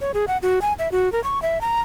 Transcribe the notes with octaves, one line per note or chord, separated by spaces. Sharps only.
C#5
G#4
F#5
F#4
G#5
E5
F#4
A#4
C#6
E5
A#5